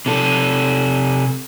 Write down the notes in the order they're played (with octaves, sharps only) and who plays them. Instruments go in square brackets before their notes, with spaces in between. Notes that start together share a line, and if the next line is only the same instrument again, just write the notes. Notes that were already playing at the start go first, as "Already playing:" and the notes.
[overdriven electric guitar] C3 A4